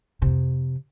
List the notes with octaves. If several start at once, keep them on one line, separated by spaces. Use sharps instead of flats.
F2 C3